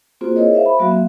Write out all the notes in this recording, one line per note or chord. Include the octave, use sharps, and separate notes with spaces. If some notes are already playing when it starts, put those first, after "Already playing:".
A#3 C4 F4 F#4 G#4 C5
E4 G#4 A#4 C#5 D#5
C5 E5 F5
B5
F#3 A#3 F#4 E5 F5
C4